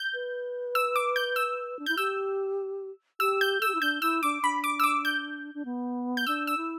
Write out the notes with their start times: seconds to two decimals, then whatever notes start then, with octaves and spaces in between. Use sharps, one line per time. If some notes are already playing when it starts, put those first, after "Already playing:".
Already playing: G6
0.14 B4
0.75 E6
0.96 D6
1.16 G6
1.36 E6
1.79 D4
1.86 E4 G6
1.97 G4 E6
3.20 G4 E6
3.41 G6
3.61 A4 E6
3.68 G4
3.75 E4
3.81 D4 G6
4.02 E4 E6
4.23 D4 D6
4.42 D4 B5
4.64 D6
4.80 E6
4.84 D6
5.05 G6
5.54 D4
5.65 B3
6.17 G6
6.27 D4 E6
6.47 E6
6.57 E4